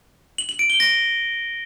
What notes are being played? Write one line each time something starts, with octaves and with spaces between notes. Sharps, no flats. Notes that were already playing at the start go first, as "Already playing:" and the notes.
F#7
F#7
D7
G7
A#6